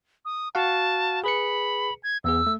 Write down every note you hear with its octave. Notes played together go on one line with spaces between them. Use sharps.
D#6
F#4 F5 F#5 A5
G#4 B4 B5 C#7
G#6
E2 B3 G#4 E6
A3